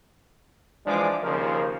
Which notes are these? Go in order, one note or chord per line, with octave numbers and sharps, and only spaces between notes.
E3 F3 G#3 D4 D5 D6
D#2 C#3 F3 A#4